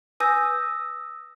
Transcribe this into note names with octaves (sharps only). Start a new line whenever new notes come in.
B4 G#5 D#6 E6 G6 A#6